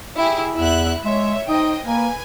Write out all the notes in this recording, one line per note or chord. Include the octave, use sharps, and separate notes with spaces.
E4 G4 G#4
E2 E4 E5 F#6
G#3 C#5 E5
D#4 C5 D#5 G5
A#3 B4 G#5